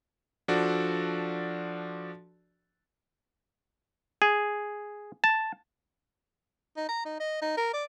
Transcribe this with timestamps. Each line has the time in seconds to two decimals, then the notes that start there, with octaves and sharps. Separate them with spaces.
0.48 F3 D4 F#4 A4 D5
4.22 G#4
5.24 A5
6.77 D#4
6.89 A#5
7.05 D#4
7.20 D#5
7.42 D#4
7.57 A#4
7.73 D5